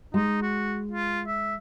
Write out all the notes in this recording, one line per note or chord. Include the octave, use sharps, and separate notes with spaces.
G#3 D#4
F#4
F4
E5